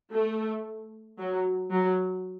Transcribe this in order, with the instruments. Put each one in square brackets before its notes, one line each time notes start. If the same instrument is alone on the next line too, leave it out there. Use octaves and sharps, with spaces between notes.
[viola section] A3
F#3
F#3